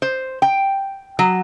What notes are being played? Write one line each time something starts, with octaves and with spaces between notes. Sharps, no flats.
C5
G5
F#3